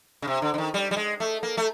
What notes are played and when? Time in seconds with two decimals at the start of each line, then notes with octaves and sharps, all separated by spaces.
0.22 C#3
0.27 C3
0.42 D3
0.54 D3
0.58 D#3
0.74 G3
0.91 G3
0.97 G#3
1.20 A3
1.43 A#3
1.57 A3